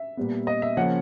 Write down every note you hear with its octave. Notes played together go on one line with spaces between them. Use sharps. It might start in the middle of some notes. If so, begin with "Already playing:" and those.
Already playing: E5
A#2 G3 B3
D#5
E5
C#3 F3 A#3 C#4 F#5